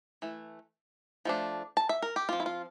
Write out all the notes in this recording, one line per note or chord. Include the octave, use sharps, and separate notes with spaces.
E3 A3
F3 A3 D4
A5
E5
A#4
G4
F3 C4 F4
E4
F4